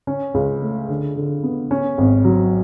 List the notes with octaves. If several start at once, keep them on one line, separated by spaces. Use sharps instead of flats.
C#4
C#2
A3
D3
D3
B3
C#4
G#1
F#3